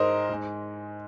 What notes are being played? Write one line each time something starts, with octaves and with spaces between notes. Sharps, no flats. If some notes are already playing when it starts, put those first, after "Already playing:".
Already playing: G#2 G#3 A#4 C5 D#5
G#2 G#3